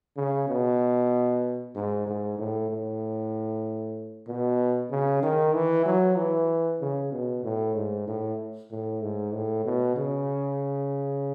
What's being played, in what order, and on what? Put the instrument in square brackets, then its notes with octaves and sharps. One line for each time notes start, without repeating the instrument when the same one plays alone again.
[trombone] C#3
B2
G#2
G#2
A2
A2
B2
C#3
D#3
E3
F#3
E3
C#3
B2
A2
G#2
A2
A2
G#2
A2
B2
C#3